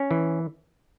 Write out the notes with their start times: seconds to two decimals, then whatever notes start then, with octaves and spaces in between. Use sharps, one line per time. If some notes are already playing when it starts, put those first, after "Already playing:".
Already playing: C#4
0.11 E3